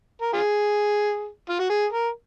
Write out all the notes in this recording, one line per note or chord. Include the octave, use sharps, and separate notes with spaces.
A#4
F4 G#4
F4
F#4
G#4
A#4